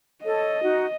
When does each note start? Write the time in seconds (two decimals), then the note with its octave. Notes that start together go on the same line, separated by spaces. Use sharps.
0.24 A4 C#5 D#5
0.63 D#4 F#4